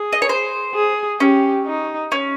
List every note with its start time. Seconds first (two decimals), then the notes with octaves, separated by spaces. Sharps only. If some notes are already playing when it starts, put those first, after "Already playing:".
Already playing: G#4
0.13 D#5
0.22 C#5
0.29 C5
0.75 G#4
1.20 C#4 G4
1.66 D#4
2.12 C#4